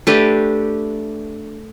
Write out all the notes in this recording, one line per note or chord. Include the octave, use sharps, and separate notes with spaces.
A3 D4 G4 B4